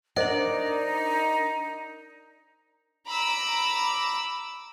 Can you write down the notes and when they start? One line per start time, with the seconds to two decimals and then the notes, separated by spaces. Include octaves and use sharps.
0.16 D4 D#4 A#4 C5 D5 D#5 F#5
3.07 A#5 B5 D6 E6